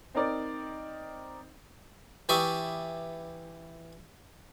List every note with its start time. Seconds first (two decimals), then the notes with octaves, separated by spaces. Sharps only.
0.14 C4 D#4 A#4 D5
2.29 E3 G4 D5 E5 C#6 D#6